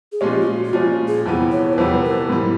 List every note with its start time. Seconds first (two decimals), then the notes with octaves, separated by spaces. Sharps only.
0.12 G#4
0.21 A#2 F3 G#3 C#4 G4
0.41 F4
0.47 F#4
0.64 F#4
0.73 A#2 F3 G#3 C#4 F4
1.08 G#4
1.25 F2 C3 E3 G3 B3
1.52 C#5
1.73 B4
1.77 F2 C3 E3 G3 B3 C5
1.95 B4
2.04 A#4
2.29 G#2 E3 G3